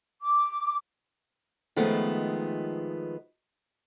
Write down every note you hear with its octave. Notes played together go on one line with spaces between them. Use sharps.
D6
D#3 F3 G#3 A3 B3